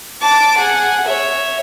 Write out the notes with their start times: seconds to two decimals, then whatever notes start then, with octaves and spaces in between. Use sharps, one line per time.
0.22 A5 D6
0.57 G#4 F#5
1.06 C#5 E5